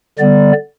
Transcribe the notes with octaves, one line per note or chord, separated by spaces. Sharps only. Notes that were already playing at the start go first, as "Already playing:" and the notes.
D3 G3 B3 D5